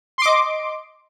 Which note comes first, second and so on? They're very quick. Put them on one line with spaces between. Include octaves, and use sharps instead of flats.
C6 D6 D#5